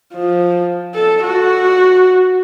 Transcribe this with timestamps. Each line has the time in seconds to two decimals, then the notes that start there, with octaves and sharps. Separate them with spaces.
0.14 F3
0.94 A4
1.24 F#4